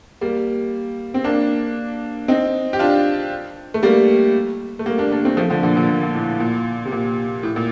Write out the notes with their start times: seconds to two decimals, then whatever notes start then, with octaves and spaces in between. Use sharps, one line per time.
0.21 G3 A#3
1.14 C4
1.24 A#3 D4
2.28 C4 D#4
2.73 G4
2.79 D4 F4
3.74 A3
3.83 G3 A#3
4.79 A3
4.86 G3 A#3
4.98 A#3 D4
5.11 A#3 D4
5.25 A3 C4
5.37 F3 A3
5.50 D3 F3
5.63 A#2 D3
5.76 A#2 D3
5.88 A#2
6.03 A#2
6.15 A2
6.40 A#2
6.85 C3
6.92 A#2
7.43 A2
7.56 A#2